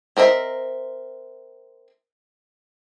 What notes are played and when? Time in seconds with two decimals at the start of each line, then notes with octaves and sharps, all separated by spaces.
0.17 C4 A#4 D#5 E5